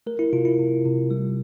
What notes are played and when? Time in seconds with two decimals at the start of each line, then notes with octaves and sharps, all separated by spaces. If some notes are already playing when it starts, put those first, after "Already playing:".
0.06 A3 A#4
0.19 E4
0.33 C3 F4
0.45 E4
0.59 C3
0.85 C3
1.11 G3